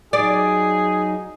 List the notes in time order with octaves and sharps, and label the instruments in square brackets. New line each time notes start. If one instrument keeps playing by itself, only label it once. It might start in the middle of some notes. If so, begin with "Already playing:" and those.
[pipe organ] F#3 D#4 [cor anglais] G#4 [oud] D5